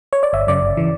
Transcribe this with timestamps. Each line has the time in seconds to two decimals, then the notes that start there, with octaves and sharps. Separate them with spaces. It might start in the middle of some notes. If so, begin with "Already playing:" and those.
0.13 C#5
0.23 D5
0.33 G1 E5
0.47 F#2 C#3 D5
0.62 G1
0.77 C#3 E3